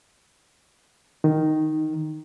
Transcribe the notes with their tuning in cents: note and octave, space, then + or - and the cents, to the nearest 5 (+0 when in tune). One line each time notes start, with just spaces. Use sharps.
D#3 +0 D#4 +0